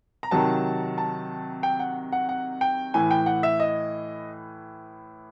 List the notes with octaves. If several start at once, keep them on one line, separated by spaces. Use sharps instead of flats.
A#5
C3 D#3 F#3 A5
A5
G5
F#5
F#5
F#5
G5
A2 E3 G#5
G5
F#5
E5
D#5